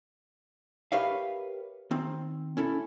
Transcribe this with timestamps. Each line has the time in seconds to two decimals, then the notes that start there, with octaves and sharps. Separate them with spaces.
0.92 G4 A#4 B4 C#5 E5 F5
1.91 D#3 C4
2.57 C#4 E4 A4